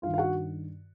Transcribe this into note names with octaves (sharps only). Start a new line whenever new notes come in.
G2 D#3 F4 F5
F5
F#4 F#5